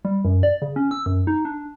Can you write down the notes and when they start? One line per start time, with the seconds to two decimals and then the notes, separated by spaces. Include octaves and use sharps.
0.05 G3
0.25 F#2
0.43 D5
0.62 C#3
0.76 C#4
0.91 E6
1.06 F#2
1.27 D#4
1.45 D4